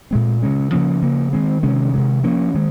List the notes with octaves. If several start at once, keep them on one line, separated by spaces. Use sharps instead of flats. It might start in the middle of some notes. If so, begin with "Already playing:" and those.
A#2 G#3 C4
C#3 G#3 C#4
C#3 F3 A#3 C#4
C#3 F3 A#3
D#3 G#3 C4
C3 D#3 G#3 C#4
C3 D#3 G#3
F3 A#3 C#4
D#3 G#3